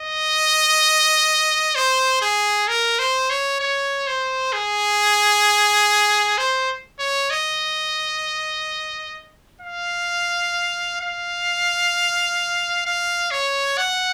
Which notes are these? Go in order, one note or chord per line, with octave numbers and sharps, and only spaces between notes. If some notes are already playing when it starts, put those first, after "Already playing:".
Already playing: D#5
C5
G#4
A#4
C5
C#5
C#5
C5
G#4
C5
C#5
D#5
F5
F5
F5
C#5
F#5